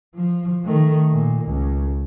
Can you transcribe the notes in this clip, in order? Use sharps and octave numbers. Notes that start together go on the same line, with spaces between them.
F3
D#3 A3
A#2
C#2